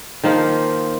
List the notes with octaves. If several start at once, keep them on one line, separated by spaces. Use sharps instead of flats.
D#3 F3 A#3